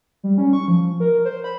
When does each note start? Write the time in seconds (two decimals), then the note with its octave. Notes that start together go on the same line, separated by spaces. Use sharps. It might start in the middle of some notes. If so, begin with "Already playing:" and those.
0.23 G3
0.38 C#4
0.53 C#6
0.68 F3
1.00 A#4
1.25 C5
1.44 B5